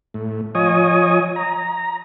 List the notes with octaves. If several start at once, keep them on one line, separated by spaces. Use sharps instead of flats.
A2
F3 C#5 D#5 G#5 D#6
A#5